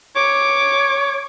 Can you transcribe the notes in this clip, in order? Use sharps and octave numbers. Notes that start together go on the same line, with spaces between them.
C#5 D6